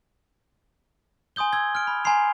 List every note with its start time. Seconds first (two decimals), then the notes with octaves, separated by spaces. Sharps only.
1.36 G#5 C6 D#6 G6 G7
1.53 E6 G#6
1.75 F6 D7
1.87 B5
2.05 G#5 A#5 C6 C7 F7